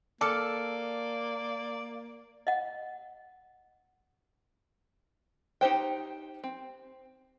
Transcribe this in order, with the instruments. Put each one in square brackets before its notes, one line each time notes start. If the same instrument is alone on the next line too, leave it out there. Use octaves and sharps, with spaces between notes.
[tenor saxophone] A#3 [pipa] A4 [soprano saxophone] D5 [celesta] D6 F6 C#7
[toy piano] D#5 F#5
[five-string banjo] D#4 G4 C5 G5
C4